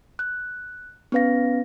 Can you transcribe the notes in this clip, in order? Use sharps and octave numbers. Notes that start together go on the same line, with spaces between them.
F#6
B3 C#4 B4 F5 A#6